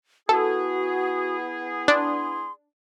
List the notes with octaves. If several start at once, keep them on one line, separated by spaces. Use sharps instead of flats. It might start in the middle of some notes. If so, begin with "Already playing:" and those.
B3 E4 F#4 G#4 A4
D4 C6